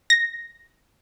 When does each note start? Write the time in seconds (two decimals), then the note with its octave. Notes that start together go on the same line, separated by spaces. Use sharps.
0.10 A#6